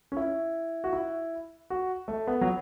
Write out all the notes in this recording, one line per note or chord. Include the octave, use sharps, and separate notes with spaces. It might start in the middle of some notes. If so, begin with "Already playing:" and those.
C#4
E4
F#4
E4
F#4
A3
B3
F#3